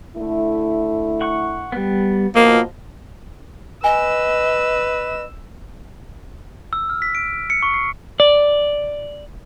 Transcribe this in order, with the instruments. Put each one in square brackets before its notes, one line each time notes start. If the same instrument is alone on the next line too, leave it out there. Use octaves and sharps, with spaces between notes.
[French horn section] D3 A3 E4
[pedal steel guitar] F#5 C#6
G3 B3
[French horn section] B2 F3 [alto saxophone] A#3 [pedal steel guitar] D#5 F5
[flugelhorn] B4 [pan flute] D#5 [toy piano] G#5 [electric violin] E6
[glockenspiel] E6
F6
B6
D7
C#7
C#6
C7
[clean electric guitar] D5